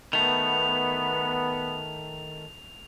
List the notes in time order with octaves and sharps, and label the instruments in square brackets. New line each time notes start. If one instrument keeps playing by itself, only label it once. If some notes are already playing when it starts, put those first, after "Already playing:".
[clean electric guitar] D#3 A3 [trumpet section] B3 [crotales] F7